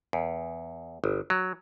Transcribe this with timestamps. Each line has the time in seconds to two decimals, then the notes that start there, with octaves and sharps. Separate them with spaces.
0.13 E2
1.04 G1
1.30 F#3